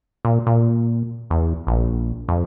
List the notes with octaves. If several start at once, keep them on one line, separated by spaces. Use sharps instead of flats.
A#2
A#2
E2
A#1
F2